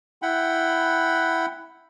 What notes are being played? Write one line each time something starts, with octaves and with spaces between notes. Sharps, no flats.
E4 F#5 G5 B5